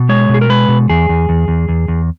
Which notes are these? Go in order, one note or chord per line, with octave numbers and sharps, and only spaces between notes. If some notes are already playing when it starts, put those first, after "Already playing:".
Already playing: B2
G#3 C#5
B2 G#4
A#4
G#3 B4
B2
E2 G#4
E2
E2
E2
E2
E2